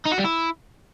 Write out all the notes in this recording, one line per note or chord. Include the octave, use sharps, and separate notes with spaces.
D#4
F#4
G3
E4